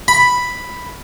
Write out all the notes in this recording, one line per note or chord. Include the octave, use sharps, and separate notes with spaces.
B5